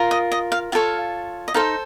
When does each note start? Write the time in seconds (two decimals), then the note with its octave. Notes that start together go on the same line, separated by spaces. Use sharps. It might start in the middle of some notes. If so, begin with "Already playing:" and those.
Already playing: F4 A#4
0.11 D#5
0.32 D#5
0.52 F5
0.72 F4 A4 C#5 F5
1.48 D#5
1.54 D#4 A4 C5 F5